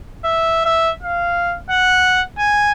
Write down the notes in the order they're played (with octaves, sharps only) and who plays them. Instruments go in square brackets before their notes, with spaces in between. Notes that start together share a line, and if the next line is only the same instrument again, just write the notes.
[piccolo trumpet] E5
E5
F5
F#5
G#5